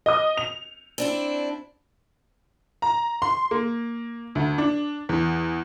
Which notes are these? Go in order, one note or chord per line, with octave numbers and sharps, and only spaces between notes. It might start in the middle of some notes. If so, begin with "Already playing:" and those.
D#5 D#6
F7
C4 D4 E4
A#5
C6
A#3
D2
D4
E2